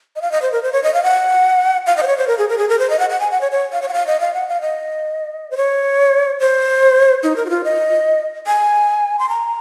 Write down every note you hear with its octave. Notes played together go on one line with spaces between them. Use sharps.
D#5
F5
D#5
C5
A#4
C5
C#5
D#5
F5
F#5
F5
D#5
C5
C#5
C5
A#4
G#4
A#4
G#4
A#4
C5
D#5
F#5
F#5
G#5
F#5
C#5
C#5
F5
C#5
F#5
F5
D#5
F5
F#5
F5
D#5
C5
C#5
C5
D#4
A#4
F#4
F4
D#5
G#5
C6
A#5